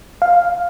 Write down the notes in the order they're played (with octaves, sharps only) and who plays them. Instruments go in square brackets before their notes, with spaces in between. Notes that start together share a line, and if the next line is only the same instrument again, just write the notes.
[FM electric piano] F5